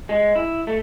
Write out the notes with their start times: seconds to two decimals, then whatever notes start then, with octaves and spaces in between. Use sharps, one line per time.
0.09 G#3
0.36 E4
0.67 A3